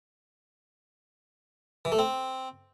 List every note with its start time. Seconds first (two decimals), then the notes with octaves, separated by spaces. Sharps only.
1.85 E3
1.92 A3
1.99 C4